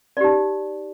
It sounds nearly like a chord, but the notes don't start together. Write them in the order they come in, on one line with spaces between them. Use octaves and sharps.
D5 G4 D#4